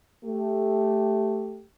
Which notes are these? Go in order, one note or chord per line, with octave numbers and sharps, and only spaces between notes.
A3 G4